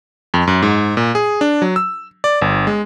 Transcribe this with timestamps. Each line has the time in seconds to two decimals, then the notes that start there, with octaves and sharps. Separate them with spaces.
0.34 F2
0.47 F#2
0.62 G#2
0.97 A#2
1.15 G#4
1.41 D4
1.62 F#3
1.76 E6
2.24 D5
2.42 G1
2.67 G#3